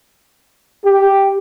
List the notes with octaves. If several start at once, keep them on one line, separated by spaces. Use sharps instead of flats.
G4